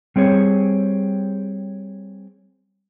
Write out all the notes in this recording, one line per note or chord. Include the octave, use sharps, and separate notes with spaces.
G3 C4 G#4 C#5